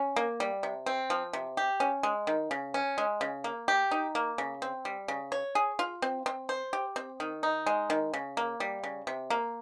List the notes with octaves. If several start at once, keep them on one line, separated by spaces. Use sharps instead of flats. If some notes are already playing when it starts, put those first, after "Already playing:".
Already playing: C#4
A#3
G3
C3
C4
F3
C3
G4
C#4
G#3
D#3
C#3
C#4
G#3
C#3
A#3
G4
D#4
A#3
C#3
C4
G3
C#3
C#5
G#4
F4
C4
C4
C5
G4
C4
D#3
D#4
G#3
D#3
C#3
A#3
G3
C#3
C3
A#3